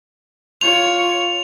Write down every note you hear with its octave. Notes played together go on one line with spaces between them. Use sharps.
F4 C#5 F7